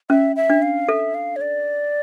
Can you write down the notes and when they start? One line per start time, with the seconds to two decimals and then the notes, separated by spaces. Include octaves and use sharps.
0.10 C#4 E5
0.36 E5
0.50 D4
0.62 F5
0.88 A4 E5
1.15 F5
1.36 C#5
1.41 D5